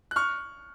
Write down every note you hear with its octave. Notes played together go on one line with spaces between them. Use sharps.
F#6
C#6 F6